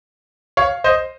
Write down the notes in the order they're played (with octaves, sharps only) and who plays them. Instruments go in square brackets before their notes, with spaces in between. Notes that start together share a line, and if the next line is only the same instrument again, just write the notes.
[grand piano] C#5 F5
C5 D#5